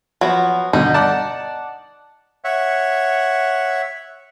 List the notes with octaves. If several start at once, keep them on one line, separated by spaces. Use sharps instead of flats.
F3 F#3 B3
G2 B2 D3 D#4
D5 F#5 A5
C#5 E5 F#5